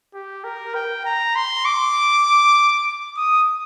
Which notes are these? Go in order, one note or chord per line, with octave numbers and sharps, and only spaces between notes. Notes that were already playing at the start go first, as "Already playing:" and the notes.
G4
A#4
G5
A#5
C6
D6
D#6